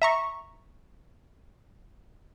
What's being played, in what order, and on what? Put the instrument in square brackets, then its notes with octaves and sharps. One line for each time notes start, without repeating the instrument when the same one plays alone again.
[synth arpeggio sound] E5 A#5 C#6